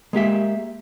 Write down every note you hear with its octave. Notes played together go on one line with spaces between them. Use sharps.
G#3 A#3 G4 E5